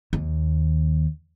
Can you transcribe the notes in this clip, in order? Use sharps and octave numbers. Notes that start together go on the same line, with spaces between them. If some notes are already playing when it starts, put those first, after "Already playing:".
D#2